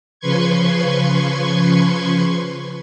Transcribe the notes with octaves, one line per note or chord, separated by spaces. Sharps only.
C#3 F3 B4 C6 C#6 G#6